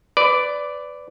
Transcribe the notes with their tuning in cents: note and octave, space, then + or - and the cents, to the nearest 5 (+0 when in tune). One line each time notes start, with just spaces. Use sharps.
B4 +20 D5 -5